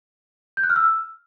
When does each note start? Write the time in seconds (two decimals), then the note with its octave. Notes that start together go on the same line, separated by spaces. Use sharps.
0.57 G6
0.63 F#6
0.70 F6
0.76 E6